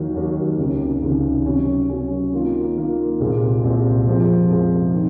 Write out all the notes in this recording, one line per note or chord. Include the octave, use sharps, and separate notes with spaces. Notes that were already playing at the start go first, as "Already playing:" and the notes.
Already playing: D#2 D#3 F#3
D#2 D#3 F#3
C#2 C3 D#3
C#2 C3 D#3
C3 F#3 C#4
C3 F#3 C#4
D#3 A#3 F4
D#3 A#3 F4
C2 A#2 G#3 C4
C2 A#2 G#3 C4
F2 C3 F3 G#3
F2 C3 F3 G#3
D#3